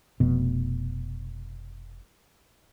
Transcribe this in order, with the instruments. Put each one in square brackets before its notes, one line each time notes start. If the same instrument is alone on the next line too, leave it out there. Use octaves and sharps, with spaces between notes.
[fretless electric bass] F1 B2